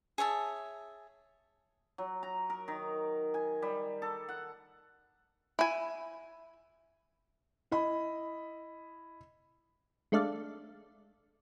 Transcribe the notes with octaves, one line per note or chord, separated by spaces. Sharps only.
G#4 C#5 E5 A5
F#3
A#5
A#4
D#3
G#5
G3
A4
F#5
E4 G#5
E4 D#5 B5
G#3 A3 D4 D5 F5